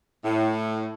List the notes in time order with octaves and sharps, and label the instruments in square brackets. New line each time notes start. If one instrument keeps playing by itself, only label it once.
[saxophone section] A2